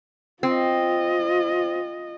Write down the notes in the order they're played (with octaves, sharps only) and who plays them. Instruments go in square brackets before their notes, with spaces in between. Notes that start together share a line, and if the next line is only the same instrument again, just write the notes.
[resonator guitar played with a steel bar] C4 [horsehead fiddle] F4 D#5